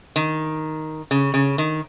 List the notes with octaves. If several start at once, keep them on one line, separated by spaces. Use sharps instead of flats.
D#3
C#3
C#3
D#3